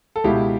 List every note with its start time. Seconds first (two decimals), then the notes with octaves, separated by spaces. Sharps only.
0.16 A4
0.24 C#2 B2 E4 G4